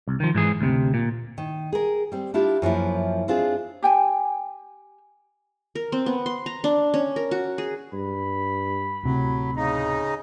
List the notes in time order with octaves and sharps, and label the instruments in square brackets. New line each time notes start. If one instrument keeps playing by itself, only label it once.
[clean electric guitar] C2
D#3 F3
G#2 E3 G#4
D2 C3
A#2
[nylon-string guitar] D#3
G#4 A#4
G3 C4
D4 E4 F4 G4
F#2 F3 A#3 E4
C4 D4 F4 G#4
[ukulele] G4 G5 G#5
[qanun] A#4
C4
B3
C6
A#5
D4
C#4
A#4
F#4
G#4
[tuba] G2 [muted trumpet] B5
[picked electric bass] D1 C3 [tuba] A2 [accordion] F#3
[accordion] C#3 D#4 [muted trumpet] A#5